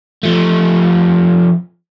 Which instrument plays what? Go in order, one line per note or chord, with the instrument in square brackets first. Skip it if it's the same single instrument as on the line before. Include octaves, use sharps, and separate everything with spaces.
[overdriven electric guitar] F3 A3